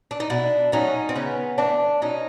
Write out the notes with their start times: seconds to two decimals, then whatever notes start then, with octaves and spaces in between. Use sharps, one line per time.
0.11 D4
0.20 D#4
0.30 B2 D4 E4
0.72 F#3 A3 C#4 D#4
1.09 C4
1.15 C#3 B3 C#4
1.58 E3 A3 C4 D4
2.01 B2 C#4 D#4